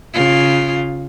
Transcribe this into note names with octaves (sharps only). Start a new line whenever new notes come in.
C#3 F4